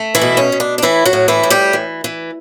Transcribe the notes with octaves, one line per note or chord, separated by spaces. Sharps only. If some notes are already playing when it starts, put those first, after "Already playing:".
Already playing: A3
E3 E4
B2
C#4
B2
D4
D4
A2 E3 E4
F#3 F#4
A2
E3 E4
A2
G3 G4
E3
E3